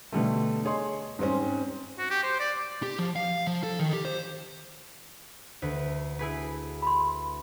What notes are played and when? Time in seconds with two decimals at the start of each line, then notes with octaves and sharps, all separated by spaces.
0.12 B2 D3 G3 A3
0.65 G#4 C#5 D#5 C6
1.19 G#2 G3 C4 C#4
1.98 F#4
2.10 G4
2.23 C5
2.40 D5
2.83 G4
2.99 F3
3.16 F5
3.47 F3
3.63 A4
3.79 D#3
3.93 G4
4.05 C5
5.62 D2 B4
6.19 E4 G#4 B4
6.82 B5 C6